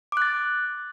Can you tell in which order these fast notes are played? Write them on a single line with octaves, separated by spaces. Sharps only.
D6 F#6 A6